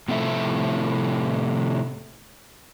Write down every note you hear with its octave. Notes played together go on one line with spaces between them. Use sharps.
A2 C3 F3 A3 E4 E5